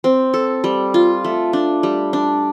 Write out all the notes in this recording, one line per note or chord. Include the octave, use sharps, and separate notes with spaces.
C4
A4
G3
F4
A3
D4
G3
D4